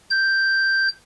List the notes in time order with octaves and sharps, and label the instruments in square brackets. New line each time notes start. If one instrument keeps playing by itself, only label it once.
[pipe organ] G6